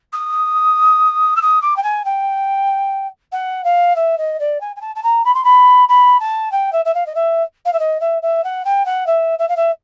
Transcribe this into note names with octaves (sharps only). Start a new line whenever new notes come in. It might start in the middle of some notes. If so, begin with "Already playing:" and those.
D#6
E6
D#6
D6
G5
G#5
G5
F#5
F5
E5
D#5
D5
G#5
G#5
A5
A5
A#5
B5
C6
B5
B5
A5
G5
E5
E5
F5
D#5
E5
F5
E5
D#5
E5
E5
F#5
G5
F#5
E5
E5
F5
E5